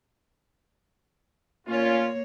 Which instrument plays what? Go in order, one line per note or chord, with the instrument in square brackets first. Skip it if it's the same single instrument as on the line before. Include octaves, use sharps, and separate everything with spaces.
[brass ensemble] A#2 C#4 F4 [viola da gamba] A#3 C#5